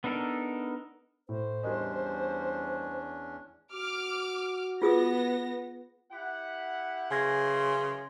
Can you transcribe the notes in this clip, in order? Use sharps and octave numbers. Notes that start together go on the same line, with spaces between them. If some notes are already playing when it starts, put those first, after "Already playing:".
B3 D4 D#4 A4 A#4
A2 C5
E2 G3 C#4 D4 A#4 D#5
F#4 D6 F6
B3 F4 G#4 D#6 A#6
E4 G4 F#5
F#2 C#3 E3 G#5 C6 G#6 A#6